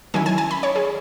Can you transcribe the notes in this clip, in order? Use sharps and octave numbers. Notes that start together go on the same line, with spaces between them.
D#3 F#3 C#4 E4 G#5
G#5
G#5
B5
C#5
G#4